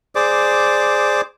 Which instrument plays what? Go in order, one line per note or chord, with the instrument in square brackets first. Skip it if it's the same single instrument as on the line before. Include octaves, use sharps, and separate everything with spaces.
[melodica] G#4 C5 D5 D6